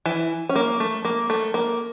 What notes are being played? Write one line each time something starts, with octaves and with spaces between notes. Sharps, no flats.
E3 E4
C#4
A#3
A3
A#3
A3
A#3